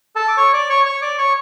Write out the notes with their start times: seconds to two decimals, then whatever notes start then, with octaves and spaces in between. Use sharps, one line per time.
0.16 A4 A5
0.28 D6
0.37 C#5 C#6
0.53 D5 D6
0.69 C#5 C#6
0.86 C#5 C#6
1.02 D5 D6
1.18 C#5 C#6